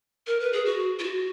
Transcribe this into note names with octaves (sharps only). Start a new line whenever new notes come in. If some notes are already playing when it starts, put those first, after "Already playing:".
A#4
B4
G#4
F#4
F4
F#4